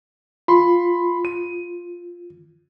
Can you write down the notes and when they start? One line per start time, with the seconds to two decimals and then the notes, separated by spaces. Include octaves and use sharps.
0.48 F4 B5 C6
1.25 D#7